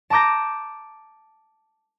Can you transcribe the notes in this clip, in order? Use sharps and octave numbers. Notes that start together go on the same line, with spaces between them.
A5 A#5 D6 G6 A#6